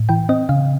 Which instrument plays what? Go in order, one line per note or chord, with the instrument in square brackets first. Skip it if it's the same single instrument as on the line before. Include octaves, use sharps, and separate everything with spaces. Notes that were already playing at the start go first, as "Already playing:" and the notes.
Already playing: [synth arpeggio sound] A2
E3 G5
C4 D#5
C#3 F5